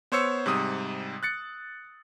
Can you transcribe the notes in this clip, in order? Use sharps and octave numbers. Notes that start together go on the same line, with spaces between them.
B3 C5 C#5 E6 C#7
G#2 C3 G3 D#6
F#6 A6 C#7